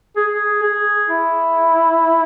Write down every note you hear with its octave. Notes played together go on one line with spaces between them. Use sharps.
G#4
G#4
G#4
E4